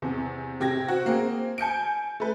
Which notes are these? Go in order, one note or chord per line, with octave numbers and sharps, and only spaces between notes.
E2 C3
C3 G4 G#6 A#6
C4 F#4
A#3 C4 G#4
G#5 G6 C#7 D7
A3 B4